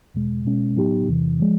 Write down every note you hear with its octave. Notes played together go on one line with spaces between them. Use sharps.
E2 B2 G#3
B2 G#3 C#4
A2 F#3 B3 D#4 G4
E2 C3 E3
F3 G#3